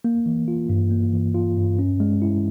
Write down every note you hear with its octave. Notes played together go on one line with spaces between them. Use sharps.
A#3
E3
F4
G2
A#3
E3
F4
G2
C#4
G#3
E4